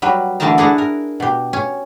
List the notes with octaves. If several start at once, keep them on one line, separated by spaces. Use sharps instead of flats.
F#3 G3 B4
D3 E3 A3 A#4 A5 A#5
D4 E4 G#4 F#5 A5 A#5
A#4
B2 G4
C#4